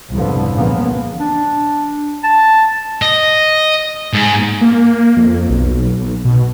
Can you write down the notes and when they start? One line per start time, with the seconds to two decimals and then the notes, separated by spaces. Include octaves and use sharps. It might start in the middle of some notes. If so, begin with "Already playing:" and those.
0.13 C2 F2 G#2 D3 F3 B3
0.54 A#2 C#3 E3 F3 A#3 B3
1.19 D4
2.24 A5
3.02 D#5
4.13 G#2
4.61 A#3
5.17 F2
5.49 B1
6.25 B2